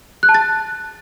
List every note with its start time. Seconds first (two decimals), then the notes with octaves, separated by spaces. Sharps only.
0.23 F#6
0.29 A5
0.35 A6